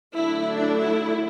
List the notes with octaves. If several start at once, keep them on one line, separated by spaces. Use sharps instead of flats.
D3 F#3 A3 D4 E4
D4
E4